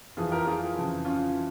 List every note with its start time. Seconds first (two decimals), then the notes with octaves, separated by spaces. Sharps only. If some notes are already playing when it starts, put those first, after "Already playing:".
0.17 F2 E3 F4 G#4
0.32 G4 A#4
0.47 F4 G#4
0.76 F2 C#3 E3
1.05 C#4 F4
1.35 E3